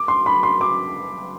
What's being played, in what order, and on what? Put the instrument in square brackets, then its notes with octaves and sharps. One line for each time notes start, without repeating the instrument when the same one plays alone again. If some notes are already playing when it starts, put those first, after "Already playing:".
Already playing: [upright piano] D6
C6
B5
C6
D6